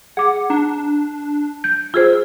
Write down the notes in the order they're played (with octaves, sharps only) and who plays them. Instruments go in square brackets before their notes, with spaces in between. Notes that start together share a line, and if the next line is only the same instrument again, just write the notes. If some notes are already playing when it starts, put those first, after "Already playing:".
[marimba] G#4 D6 [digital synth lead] F#5
[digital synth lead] D4 [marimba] A#5
[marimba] G6
[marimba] F4 G#4 C5 [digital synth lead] E6